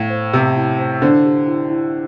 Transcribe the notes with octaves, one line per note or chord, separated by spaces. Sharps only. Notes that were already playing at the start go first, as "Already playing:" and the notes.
Already playing: A2 E4 F5
C5
C3 G4
E4
C5
D3 C5
G4
E4
E4